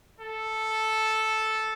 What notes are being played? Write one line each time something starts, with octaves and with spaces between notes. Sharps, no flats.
A4